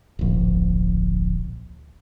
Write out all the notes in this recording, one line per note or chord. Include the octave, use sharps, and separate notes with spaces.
D1 A#1